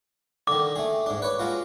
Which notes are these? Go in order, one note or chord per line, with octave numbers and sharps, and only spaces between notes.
D3 D#3 D6
A3 G#4
G#2 D4
B4 C#5
G#3 F4 F#4